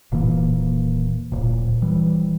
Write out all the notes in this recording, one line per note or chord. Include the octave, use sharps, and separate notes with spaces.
D#1 A#2 E3 A#3
D1 A#2
E3 G3